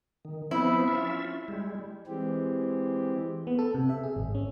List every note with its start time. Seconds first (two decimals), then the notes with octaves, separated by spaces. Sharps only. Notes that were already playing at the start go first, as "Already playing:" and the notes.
0.25 D#3
0.51 F3 B3 C4 E4
0.88 C#4 F4 E5
1.48 G3 G#3
2.07 E3 G#3 C4 G4
3.47 B3
3.59 A4
3.74 C3
3.89 E5
4.03 G#4
4.16 G#1
4.35 C#4